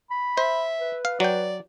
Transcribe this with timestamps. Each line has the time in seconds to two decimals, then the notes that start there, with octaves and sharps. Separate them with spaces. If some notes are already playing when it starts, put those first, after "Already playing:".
0.10 B5
0.38 C5 E5
0.80 B4
1.05 F5
1.20 F#3 D5 G5